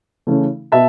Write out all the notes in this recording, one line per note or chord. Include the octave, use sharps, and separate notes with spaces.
C#3 E3 A3 C#4
B2 B3 E5 A5